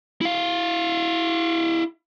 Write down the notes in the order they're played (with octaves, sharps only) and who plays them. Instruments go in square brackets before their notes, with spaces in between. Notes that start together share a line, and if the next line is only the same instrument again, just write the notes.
[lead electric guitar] E4 F5